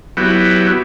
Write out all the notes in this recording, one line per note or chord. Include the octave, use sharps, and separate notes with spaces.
F#3 B3 E4 G4